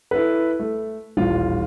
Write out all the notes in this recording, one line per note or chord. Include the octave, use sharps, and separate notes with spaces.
E4 A4 B4
A3
D#1 A1 F4